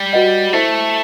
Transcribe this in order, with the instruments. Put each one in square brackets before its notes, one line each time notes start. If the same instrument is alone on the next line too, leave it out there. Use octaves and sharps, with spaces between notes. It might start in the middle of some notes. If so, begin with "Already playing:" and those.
Already playing: [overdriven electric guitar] G3
[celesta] F#4 B4 D#5 F#5
[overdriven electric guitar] A3 [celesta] E4 A4 C5 E5 A5